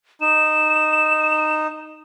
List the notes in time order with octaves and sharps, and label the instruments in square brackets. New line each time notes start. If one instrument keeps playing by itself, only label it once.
[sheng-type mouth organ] D#4 [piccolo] E7